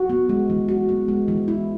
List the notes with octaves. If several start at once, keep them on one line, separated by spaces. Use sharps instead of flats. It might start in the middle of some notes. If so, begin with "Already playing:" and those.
Already playing: F#4
B3
G#3
E3
F#4
B3
G#3
E3
E4